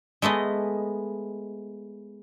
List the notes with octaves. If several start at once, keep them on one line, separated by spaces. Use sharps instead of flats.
G#3 A3 B3 D#5